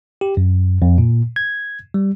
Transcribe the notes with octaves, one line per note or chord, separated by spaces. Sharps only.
G4
F#2
F2
A#2
G#6
G3